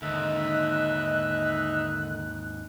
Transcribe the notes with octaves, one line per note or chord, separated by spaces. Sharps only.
D#2 G#2 D3 D#4 E5 F#6